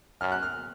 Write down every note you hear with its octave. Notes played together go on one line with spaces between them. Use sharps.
F#2 F6
F#6
F6